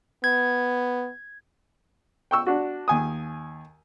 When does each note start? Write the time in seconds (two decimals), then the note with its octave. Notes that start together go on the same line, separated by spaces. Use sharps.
0.24 B3 G#6
2.31 G5 C#6 E6
2.47 D4 F#4
2.88 D#2 G#5 D#6